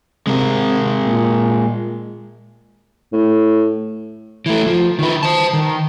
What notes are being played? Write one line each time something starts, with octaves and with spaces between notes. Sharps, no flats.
C3 G#3 A#4
A#2
A2
E3 A3
F3
D#3 B4
C5 A5
D#3